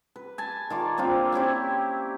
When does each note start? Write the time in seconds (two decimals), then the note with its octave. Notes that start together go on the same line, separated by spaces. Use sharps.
0.16 B4
0.38 G#5 A5
0.70 D#3 F4 D5
0.98 A#3 C4 D4 F4
1.32 C4 C#4 E4 G4